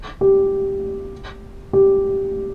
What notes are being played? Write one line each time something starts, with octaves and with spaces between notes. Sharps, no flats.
G4
G4